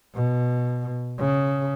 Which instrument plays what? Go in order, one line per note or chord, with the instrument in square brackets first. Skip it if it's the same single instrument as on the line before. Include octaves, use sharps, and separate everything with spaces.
[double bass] B2
C#3